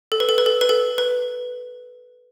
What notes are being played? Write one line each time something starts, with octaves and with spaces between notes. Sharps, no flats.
A4
B4
A4
B4
A4
B4
A4
B4